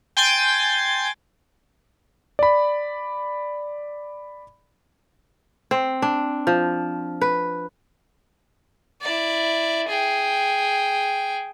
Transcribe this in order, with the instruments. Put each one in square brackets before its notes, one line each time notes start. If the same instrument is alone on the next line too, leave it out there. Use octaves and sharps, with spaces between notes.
[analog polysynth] G5 G#5 C6 G6 A6
[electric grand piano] D5 B5
[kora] C4
D4
F3
B4
[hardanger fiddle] E4 D5
G#4 G5